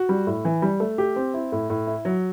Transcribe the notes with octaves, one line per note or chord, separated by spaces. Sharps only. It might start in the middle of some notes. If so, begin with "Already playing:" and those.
Already playing: F#4
G3
A2
E3
G3
A3
G4
C4
E4
A2
A2
E4
F#3